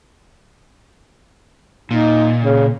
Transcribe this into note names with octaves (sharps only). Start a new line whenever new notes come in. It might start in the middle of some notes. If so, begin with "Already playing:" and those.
A#2 D#4
C#3